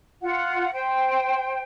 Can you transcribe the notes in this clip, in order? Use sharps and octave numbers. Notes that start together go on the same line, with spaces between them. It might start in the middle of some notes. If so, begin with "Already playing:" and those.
F4 F#5
C5 G5